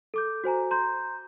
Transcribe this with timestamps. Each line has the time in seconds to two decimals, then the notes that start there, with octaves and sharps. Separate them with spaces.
0.14 A4 D6 G6
0.44 F#4 C5 G#5 A#5
0.71 A#5 C6 G6